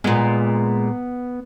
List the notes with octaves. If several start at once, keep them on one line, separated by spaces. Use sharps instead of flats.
A#2 G#3 B3